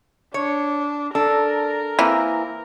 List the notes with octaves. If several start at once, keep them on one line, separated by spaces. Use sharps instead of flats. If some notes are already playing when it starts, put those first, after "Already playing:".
D4 C#5
D4 A4 A#4
E3 A#3 C4